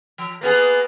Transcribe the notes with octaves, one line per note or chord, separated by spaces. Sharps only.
F3
A#3 B3 G#4